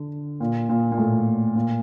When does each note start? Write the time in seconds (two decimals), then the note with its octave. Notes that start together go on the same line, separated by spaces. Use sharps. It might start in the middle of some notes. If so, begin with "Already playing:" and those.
Already playing: D3
0.40 A#2
0.69 A#2
0.92 A#2
0.98 A2
1.56 A#2